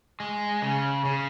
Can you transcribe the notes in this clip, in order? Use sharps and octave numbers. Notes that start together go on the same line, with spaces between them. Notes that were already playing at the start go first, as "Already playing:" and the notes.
G#3
C#3
C#3